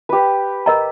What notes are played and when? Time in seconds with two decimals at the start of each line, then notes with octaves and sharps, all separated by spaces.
0.09 G4 B4
0.66 A#4 D#5 A#5